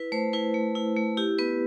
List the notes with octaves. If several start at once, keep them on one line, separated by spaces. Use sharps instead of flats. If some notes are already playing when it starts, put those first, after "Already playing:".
Already playing: E4 B4
A3 C5
E4 B4
A3
E4
A3
E4 G4
B3 B4